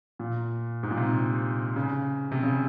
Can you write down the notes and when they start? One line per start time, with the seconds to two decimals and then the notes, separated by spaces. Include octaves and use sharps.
0.19 A#2
0.83 G#2
0.91 A#2
0.97 C3
1.76 C#3
2.32 C3
2.43 C#3